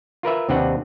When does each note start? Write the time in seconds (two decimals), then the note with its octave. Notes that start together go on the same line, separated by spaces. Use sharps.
0.23 F4 A#4 B4 E5
0.49 D#2 C3 C4 D4 B4 F#5